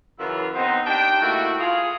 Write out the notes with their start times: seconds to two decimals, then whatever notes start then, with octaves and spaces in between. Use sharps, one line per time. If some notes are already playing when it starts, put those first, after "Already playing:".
0.19 F#2 C#3 E3 E4 F4
0.55 B3 C4 D#4
0.86 D4 D#4 G4 G5
1.22 A2 A#3 E4 F#4
1.60 F4 G#4